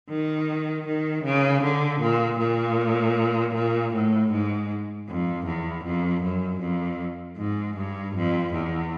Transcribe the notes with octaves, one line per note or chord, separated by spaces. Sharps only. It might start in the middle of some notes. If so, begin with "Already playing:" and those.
D#3
D#3
C#3
D3
A#2
A#2
A#2
A2
G#2
F2
E2
F2
F#2
F2
G#2
G2
F2
E2